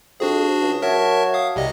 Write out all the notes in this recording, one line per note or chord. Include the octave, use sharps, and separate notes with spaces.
F2 D4 F#4 G#4
C#2
F#3 A#4 E5 A5
F5 D#6
C2 C3 G3 D#5